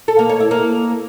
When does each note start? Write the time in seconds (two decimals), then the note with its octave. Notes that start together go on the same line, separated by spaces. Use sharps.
0.08 A4
0.19 A#3
0.29 C#5
0.40 E4
0.51 A#3